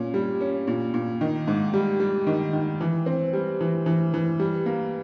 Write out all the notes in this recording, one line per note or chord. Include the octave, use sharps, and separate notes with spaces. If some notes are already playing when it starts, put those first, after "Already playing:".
Already playing: A#2 C#4
G3
C#4
A#2
A#2
D#3
G#2
G3
G3
D#3
D#3
E3
C4
G3
E3
E3
E3
G3
A#3